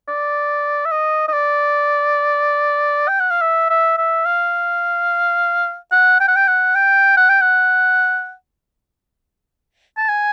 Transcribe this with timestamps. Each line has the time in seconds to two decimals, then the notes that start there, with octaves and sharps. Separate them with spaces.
0.08 D5
0.85 E5
0.91 D#5
1.28 D#5
1.33 D5
3.08 G5
3.20 F#5
3.31 F5
3.41 E5
3.70 E5
3.97 E5
4.25 F5
5.92 F#5
6.20 G5
6.28 F#5
6.36 G5
6.47 F#5
6.75 G5
7.17 F#5
7.29 G5
7.41 F#5
9.97 A5
10.09 G#5